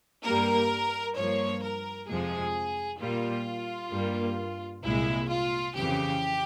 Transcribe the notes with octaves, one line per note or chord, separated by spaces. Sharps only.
G2 G3 A#3 A#4
G2 F3 A#3 C#5
A#4
F2 C3 F3 G#3 G#4
A#2 G3 A#3 F4
G2 G3 A#3
C2 A#2 G#3 E4
F4
F2 C#3 E3 G4